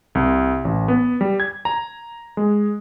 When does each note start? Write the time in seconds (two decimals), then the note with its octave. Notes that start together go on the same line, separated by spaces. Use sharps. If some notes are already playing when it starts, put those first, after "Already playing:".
0.15 C2
0.65 A1
0.88 B3
1.21 G3
1.40 G#6
1.65 A#5
2.37 G#3